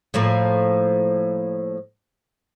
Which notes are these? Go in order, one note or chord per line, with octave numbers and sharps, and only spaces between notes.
A2 F3 A#3